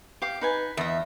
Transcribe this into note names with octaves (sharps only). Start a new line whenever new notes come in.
G4 F5 D6
D#4 B4 G#5
E2 D#5 E5